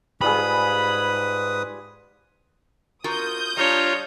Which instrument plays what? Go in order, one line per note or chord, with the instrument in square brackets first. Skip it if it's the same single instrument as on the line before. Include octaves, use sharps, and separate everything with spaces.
[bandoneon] G#2 B4 D#6 [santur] G3 F4 G#4 [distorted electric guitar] B5
[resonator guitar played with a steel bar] F4 F#4 A#4 [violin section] D#6 G6
[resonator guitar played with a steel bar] G3 D4 [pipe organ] F4 A#5 [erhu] C#5